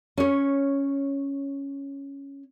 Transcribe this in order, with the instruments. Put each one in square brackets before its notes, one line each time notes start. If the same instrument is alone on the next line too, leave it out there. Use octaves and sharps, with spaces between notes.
[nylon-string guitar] C#4 C#5